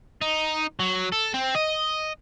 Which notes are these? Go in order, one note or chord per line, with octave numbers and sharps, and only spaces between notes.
D#4
F#3
A4
C4
D#5